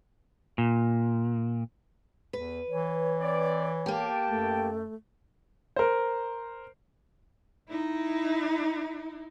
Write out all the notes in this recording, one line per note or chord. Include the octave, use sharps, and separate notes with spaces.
A#2
E2 B4
E3 C#5
C4 D5
A#3 G4 G5 A5
F#2 A3
A#4 C5
D#4 E4